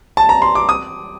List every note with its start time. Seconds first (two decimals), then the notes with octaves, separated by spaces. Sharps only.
0.17 A5
0.29 A#5
0.42 C6
0.55 D6
0.69 D#6